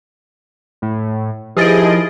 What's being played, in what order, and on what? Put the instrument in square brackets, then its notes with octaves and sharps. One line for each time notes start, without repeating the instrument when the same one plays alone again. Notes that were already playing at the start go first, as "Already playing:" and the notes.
[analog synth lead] A2
[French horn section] D#3 E4 [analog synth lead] F3 [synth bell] G4 A6 D7 [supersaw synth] G#4 D#5